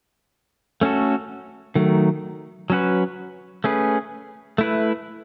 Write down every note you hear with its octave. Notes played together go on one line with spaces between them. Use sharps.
A3 C#4 F#4 A4
D#3 F#3 A3
F#3 C#4 F#4 B4
A3 C#4 G#4 B4
A3 E4 B4